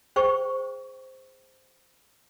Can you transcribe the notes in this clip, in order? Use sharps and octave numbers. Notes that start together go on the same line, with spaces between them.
G#4 C5 G5 C#6